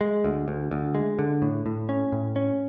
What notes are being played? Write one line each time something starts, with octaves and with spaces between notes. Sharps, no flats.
G#3
D2
D2
D2
G#3
D3
A2
A2
C#4
A2
C#4